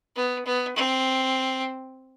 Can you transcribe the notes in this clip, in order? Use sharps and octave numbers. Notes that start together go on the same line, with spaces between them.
B3
B3
C4